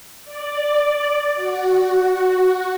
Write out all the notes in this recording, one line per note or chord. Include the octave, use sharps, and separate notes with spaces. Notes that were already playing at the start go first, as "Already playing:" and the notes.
D5
F#4